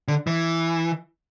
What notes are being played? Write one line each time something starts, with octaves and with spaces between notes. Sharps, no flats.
D3
E3